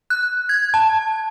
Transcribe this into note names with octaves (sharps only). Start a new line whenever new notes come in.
F#6
G#6
A5